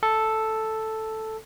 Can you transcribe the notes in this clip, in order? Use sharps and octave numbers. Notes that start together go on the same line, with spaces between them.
A4